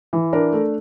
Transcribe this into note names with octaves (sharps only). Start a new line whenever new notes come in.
E3
D4 A#4
A3